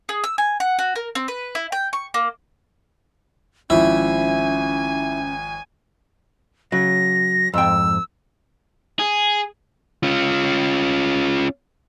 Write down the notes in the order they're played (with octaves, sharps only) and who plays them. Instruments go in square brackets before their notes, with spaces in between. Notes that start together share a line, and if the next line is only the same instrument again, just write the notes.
[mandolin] G#4
E6
G#5
F#5
F#4
A#4
C4
B4
E4
G5
C#6
A#3
[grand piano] G#1 F3 [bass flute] C#4 [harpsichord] E4 [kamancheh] G#5
[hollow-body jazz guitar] C#3 F#3 [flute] A#6
[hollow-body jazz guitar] F2 G#2 G5 [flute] E6
[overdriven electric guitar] G#4
[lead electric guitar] C#4 F4